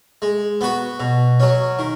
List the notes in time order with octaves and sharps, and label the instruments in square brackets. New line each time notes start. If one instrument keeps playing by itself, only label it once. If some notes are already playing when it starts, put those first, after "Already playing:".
[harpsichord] G#3
B3 F#4 B4
B2
F#3 C#4
D#3